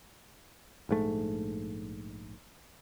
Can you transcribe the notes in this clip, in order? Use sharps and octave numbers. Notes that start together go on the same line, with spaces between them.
A#1 G#2 A3